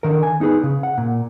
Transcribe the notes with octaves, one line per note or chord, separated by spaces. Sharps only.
D3 D#3 A#4
G#5
B3 D#4 G4 G#4 B4
C#3
F#5
A#2